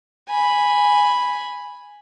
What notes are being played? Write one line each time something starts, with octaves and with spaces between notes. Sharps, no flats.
G#5 B5